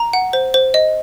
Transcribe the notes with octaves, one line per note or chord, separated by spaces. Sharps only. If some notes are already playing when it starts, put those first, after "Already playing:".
Already playing: A#5
F#5
C5
C5
D#5